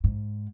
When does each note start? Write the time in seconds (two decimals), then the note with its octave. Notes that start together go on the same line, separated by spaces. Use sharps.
0.04 G#2